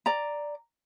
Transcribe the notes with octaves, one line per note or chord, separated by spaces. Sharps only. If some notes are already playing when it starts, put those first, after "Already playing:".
D5 A#5